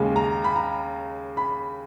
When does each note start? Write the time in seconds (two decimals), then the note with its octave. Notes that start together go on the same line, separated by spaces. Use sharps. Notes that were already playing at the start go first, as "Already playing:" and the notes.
Already playing: D#2 C#3 G#3
0.16 A#5
0.44 B5
0.56 A#5
1.37 B5